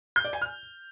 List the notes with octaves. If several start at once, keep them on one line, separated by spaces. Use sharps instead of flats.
G6
D5
G#5
F6